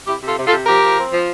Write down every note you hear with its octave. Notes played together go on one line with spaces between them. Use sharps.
C3 E4 G4
C3
F4 A4
C3
F4 A4
C3
F3 G4 A#4
F3
C4
F3